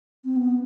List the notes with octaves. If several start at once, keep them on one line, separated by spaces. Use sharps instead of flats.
C4
B3